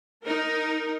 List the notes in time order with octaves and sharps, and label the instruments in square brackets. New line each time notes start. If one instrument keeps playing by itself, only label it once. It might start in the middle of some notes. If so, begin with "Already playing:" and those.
[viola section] D#4 A#4